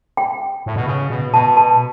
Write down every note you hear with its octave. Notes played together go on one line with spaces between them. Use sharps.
G5
A2
B2
C#3
B2
B2 A5
A5